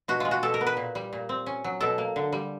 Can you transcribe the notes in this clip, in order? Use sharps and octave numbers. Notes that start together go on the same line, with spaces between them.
B2 F#4
G#3 F4
F#4
B2 A4
A#4
B3
B4
A#2
G3
A#2
C4
C#4
F#3
B2 A4
A#3
D3
G3